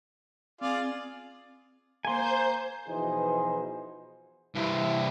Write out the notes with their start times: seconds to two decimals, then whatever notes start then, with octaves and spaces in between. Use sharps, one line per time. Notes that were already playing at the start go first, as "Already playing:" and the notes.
0.61 C4 F4 G#4 D5
2.05 A#3 C5 G#5 C6 G6
2.88 B2 E3 F3 D#4 G#4 C5
4.55 G2 C3 E4